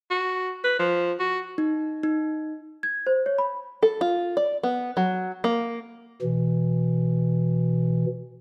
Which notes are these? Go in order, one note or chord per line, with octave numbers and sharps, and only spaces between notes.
F#4
B4
F3
F#4
D#4
D#4
G#6
C5
C#5
B5
A4
F4
D5
B3
F#3
A#3
B2 E3